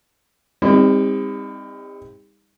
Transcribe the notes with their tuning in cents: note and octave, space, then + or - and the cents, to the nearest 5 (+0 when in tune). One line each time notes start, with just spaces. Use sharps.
G3 +40 C4 +0 D#4 +25